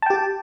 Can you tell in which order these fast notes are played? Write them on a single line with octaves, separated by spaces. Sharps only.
A5 G5 G4